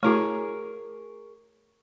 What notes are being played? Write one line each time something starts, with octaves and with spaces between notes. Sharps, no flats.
A3 E4 F#4 G#4 A#4 C#5